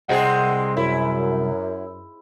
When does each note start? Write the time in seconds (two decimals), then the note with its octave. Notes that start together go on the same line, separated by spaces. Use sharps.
0.09 C2 G#3 C4 G#4 D#5 F#5
0.77 F#2 E4